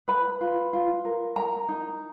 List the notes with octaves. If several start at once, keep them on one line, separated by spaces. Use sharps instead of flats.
B4 B5
F4
F4
A#4
A#4 A#5
D#4